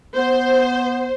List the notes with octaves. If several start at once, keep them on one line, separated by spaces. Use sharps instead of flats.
B3 C5